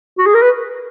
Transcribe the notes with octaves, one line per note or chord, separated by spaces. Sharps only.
F#4
G#4
A#4
B4